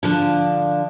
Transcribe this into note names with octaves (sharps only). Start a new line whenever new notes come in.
D3 F3 D4